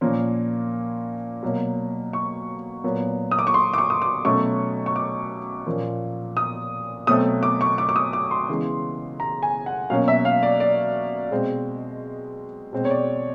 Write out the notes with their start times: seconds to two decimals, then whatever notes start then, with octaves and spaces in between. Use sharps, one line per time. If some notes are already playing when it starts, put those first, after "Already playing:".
0.01 A#2 F3 A#3 C#4
1.43 B2 F#3 A#3
2.13 C#6
2.84 A#2 F#3 B3
3.31 D#6
3.39 D6
3.47 C#6
3.54 C6
3.74 D6
3.78 C#6
3.90 D#6
4.02 D6
4.25 B2 F#3 A3 C#4 C#6
4.86 C#6
4.96 D6
5.66 A#2 F3 A#3 C#4
6.37 D#6
7.07 B2 F#3 A3 C4 D#6
7.43 D6
7.61 C#6
7.78 D6
7.89 D6
7.96 D#6
8.13 D6
8.31 C6
8.49 C#3 E3 G#3 B3
9.20 A#5
9.43 G#5
9.66 F#5
9.90 B2 F#3 A#3 C#4 F5
10.08 E5
10.25 F5
10.43 D5
10.60 D5
11.31 B2 G#3 C4
12.73 B2 G#3 C4
12.85 C#5
12.90 D5